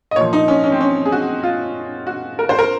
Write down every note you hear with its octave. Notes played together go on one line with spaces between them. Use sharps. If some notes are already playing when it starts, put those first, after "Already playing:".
D#5
A#2 C#5
F3
D#4
C#4
C#4
C4
C#4
G#4
F#4
F4
F#4
A#4
C5
A#4